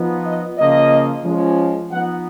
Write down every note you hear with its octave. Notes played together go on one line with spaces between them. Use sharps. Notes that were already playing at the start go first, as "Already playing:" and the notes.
Already playing: F3 B3 D#4
D#5
C#3 F3 A#3 D#5
F3 G#3 C#4
F3 B3 D#4 F#5